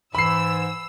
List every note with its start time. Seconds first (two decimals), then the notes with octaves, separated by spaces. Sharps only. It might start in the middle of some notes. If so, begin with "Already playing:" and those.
0.15 G#2 E3 B5 E6 C7